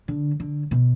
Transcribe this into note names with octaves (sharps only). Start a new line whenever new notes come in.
D3
D3
B2